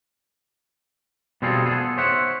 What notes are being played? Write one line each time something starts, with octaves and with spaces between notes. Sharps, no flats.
B2 G3 C4 F4 G#4 A4
B3 G#4 A4
C5 C#5 E5 F#5